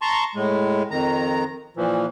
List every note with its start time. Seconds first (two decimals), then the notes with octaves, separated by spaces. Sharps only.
0.02 A5 A#5 C6 C#6
0.35 A2 G#3
0.91 F2 D#3 A#5
1.77 A#2 E3 F3